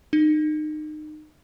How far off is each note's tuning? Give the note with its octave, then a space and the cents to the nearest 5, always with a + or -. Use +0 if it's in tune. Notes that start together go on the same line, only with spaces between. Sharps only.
D#4 -30